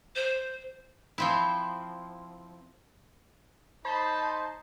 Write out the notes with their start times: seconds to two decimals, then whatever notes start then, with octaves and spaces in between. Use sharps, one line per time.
0.15 C5
1.18 F3 C4 E4
3.85 D#4 C5 A5 B5